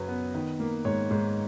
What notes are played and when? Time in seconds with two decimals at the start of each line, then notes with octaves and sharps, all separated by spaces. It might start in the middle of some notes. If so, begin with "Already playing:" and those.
Already playing: F#2 C#3 F#3 B4 C#5
0.08 B3
0.35 D#3
0.60 A#3
0.85 G#2 C#5
1.11 G#2